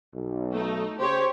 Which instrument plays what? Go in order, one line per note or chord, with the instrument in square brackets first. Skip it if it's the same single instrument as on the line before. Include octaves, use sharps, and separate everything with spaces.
[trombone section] B1
[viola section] A3 D#4
[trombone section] C#3 C5 [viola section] G4 C#5